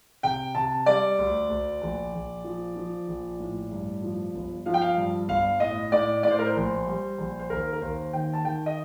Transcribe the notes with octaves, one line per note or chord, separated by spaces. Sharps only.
C3 G5
C3 A5
G3 D5
D2
D2
A#1
A#1
F3
F3
A#1
A2
G2
F3
G1
F3 F5
G5
F5
G2
G1 F5
A2 D#5
A2 D5
A2 D5
C5
A#4
C5
A#1
G3
A#1
C5
D#2 A#4
A#4
D#2 C5
D#3 G5
A5
D#3 G5
D#5